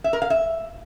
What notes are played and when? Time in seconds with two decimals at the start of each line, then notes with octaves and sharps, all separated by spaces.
0.04 E5
0.13 A#4
0.22 F5
0.30 E5